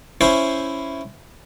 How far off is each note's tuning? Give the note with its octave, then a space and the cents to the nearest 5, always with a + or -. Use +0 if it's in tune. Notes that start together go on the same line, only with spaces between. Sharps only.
C#4 +0 E4 +5 C5 +0